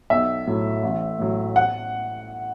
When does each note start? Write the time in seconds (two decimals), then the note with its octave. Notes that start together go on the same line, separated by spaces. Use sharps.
0.10 B1 E5
0.47 A2 F#3
0.83 A1
1.19 A2 F#3
1.56 F#5